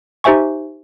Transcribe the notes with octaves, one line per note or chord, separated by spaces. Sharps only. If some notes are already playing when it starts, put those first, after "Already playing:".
D#4 G4 C5 E5 G#5 C#6